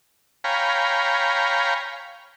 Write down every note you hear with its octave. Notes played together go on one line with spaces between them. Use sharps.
C#5 F5 G5 G#5 A#5 B5